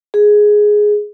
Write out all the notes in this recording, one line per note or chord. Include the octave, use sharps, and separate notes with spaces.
G#4